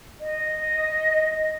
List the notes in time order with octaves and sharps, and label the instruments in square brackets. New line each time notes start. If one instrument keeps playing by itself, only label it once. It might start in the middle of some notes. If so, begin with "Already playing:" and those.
[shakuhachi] D#5